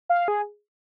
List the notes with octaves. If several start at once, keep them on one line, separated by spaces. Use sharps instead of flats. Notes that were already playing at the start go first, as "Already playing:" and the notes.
F5
G#4